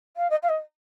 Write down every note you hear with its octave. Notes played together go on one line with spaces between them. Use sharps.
F5
D#5
F5
D#5